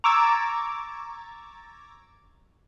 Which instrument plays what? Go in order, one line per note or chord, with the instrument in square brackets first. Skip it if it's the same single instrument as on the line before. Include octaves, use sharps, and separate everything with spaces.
[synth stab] A#5 C#6 D6 E6 G#6 A6